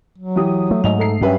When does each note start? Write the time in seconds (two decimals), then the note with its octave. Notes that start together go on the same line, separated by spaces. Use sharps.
0.18 F#3
0.36 E3 G4 D#6
0.71 A3
0.84 G#2 A3 D#5 F7
0.99 A4 A#5 C7
1.21 G2 F#3 C#4 G4 B4 E5